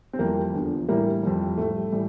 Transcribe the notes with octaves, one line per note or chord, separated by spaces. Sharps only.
C4
F2 E3 G3 A#3
E2 D3 F3
A2 E3 G3 A#3
F2 E3 G3
A2 G3 A3
A2 E3 G3